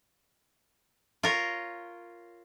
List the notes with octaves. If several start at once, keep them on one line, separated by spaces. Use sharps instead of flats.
F4 A#4 C#5